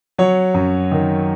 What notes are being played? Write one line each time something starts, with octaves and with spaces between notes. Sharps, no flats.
F#3 C#5
F#2
D#3